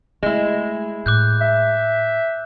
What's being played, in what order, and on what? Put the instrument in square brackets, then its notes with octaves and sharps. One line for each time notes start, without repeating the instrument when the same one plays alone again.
[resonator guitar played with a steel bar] G#3 E4 [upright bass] A3
[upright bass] A2 [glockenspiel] D6 F#6 G6
[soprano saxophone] E5